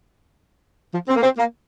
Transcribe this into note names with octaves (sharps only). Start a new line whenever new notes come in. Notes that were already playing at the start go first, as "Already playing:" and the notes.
F3
C4
A#3
C4
A#3